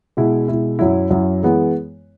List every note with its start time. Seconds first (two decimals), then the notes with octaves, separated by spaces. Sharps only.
0.17 B2 G#3 E4
0.48 B2 G#3 E4
0.79 F#2 F#3 E4
1.11 F#2 F#3 E4
1.43 E3 G#3 B3